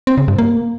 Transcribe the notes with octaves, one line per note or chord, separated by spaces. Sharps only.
C4
C#3
G2
A#3